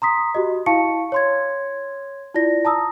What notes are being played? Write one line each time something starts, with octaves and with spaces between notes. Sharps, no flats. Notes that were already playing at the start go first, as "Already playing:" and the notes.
A#5 C6 D#6 B6
F#4 G4 D#5
E4 F5 A5 C#6 C#7
C#5 C6 G#6
E4 F4 D5 A#6
A5 A#5 D#6 E6